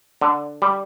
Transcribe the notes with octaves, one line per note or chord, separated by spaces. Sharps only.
D3
G3